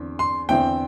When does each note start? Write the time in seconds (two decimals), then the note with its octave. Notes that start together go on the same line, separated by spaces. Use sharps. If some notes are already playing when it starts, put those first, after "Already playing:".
Already playing: E2 D3 C4
0.19 C6
0.49 E2 D3 C4 E4 G5